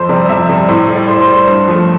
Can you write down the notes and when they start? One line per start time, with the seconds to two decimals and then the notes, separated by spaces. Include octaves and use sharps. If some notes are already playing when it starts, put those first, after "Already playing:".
Already playing: F2 C5
0.09 C3 G3 D5
0.29 F2 E5
0.49 C3 G3
0.68 A2 C5
0.88 G3
0.96 D5
1.08 A2 C5
1.21 C5
1.28 G3
1.34 C5
1.47 G2 C5
1.68 F3 A3